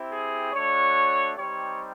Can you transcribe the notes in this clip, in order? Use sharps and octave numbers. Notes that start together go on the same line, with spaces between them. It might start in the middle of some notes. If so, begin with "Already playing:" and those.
Already playing: C4 E4 G4
G#4
A3 D4 F#4 C#5
G3 C4 D#4 G4 C#5